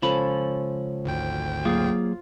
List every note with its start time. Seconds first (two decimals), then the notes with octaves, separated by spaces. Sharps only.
0.02 C#2 F3 C#4 A4 B5
1.04 G#1 D2 G5
1.65 F#3 A#3 F4 G#4